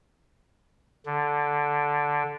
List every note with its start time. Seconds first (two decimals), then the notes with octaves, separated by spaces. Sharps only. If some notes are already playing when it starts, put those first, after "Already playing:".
1.06 D3